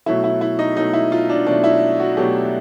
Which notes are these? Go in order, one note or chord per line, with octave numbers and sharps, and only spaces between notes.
B2 F#3 A3 E4
E4
E4
D#4
B2 F#3 A3 D#4
E4
F4
D4
B2 F#3 A3 D4
E4
F#4
B2 F#3 A3 G4